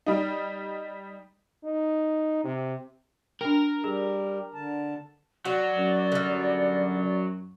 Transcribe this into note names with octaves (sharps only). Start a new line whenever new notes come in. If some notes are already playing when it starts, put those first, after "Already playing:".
G3 D#4
D#4
C3
D4 A#4 G5
G3 G4 G#4
D3 A5
F#3 F#4 D5
F#2
D3 G3